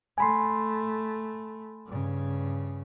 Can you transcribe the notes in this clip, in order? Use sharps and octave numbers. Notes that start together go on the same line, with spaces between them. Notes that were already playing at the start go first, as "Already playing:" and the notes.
A3 G#5 B5 C6
G2 C#3